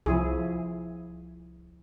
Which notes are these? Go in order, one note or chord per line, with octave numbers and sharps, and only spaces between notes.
C2 F3 E4 G#4